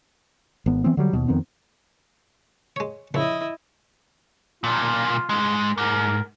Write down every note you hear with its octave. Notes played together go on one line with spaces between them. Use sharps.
G#1 B3
E3 B3 C4
D3 F#3 G3
D#2 B2
F2 D#3 B3 C4
G#3 C#5
A#1 C#3 E4 D#5
B1 A#2 F4
G#2 G#3
G#2 A#4